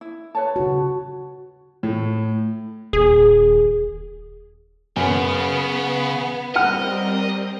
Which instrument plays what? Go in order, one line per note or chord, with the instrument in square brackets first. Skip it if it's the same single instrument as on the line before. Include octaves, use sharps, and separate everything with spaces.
[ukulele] E4
B4 C#5 A5
[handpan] C#3 F#4
[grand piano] A2
[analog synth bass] D#1 [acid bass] G#4
[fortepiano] F#2 [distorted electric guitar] C#3 [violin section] B3
[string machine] G3 C4 A#4 [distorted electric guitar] D#5 [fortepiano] F#5 G5 F6